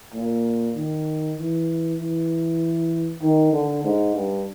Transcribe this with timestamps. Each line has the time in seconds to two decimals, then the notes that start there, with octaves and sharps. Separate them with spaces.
0.14 A#2
0.76 D#3
1.38 E3
1.99 E3
3.22 D#3
3.53 D3
3.84 G#2
4.15 G2